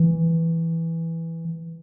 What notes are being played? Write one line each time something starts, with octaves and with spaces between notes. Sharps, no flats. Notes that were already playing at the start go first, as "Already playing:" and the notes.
Already playing: E3